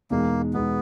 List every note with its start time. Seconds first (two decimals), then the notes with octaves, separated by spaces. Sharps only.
0.10 E2 B2 G#3 A#3 D#4
0.54 E2 B2 G#3 B3 D#4